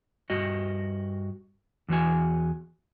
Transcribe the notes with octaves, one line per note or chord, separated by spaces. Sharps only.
G2 F#4 D#5
E2 E3 F#4 G#5